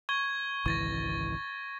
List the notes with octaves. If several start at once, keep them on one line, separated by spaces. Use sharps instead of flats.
C#6 G#6 G7
G#1 C#2 E3 C#6 A6 A#6